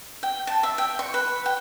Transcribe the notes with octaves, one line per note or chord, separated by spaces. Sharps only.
G5
A5
E5
G5
C#6
B4
G5